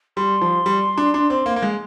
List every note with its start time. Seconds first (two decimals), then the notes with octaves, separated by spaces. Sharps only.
0.17 G3 C6
0.41 F3
0.66 G3
0.98 D4
1.14 D4
1.30 C4
1.46 A#3
1.56 A#3
1.62 G#3